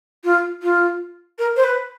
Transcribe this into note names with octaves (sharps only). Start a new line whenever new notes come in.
F4
F4
A#4
C5
B4